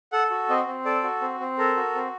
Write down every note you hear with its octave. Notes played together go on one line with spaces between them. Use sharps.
A4 F#5
F#4
C4 D#5
C4
A4 D5
F#4
C4
C4
A4 A#4
F#4
C4